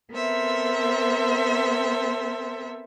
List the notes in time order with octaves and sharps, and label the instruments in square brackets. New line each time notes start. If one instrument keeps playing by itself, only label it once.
[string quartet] B3 C4 A4 A#4 C5 E5